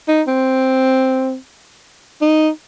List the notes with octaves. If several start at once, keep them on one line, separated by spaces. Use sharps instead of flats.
D#4
C4
D#4